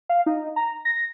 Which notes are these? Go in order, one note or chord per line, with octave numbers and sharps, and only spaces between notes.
F5
D#4
A#5
A#6